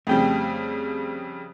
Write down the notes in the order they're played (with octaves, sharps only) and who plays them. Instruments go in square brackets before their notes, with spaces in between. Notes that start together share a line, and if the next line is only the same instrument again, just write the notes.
[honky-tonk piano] F2 C#3 G3 [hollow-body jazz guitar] A3 G5